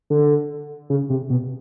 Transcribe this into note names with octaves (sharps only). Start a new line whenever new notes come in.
D3
C#3
C3
B2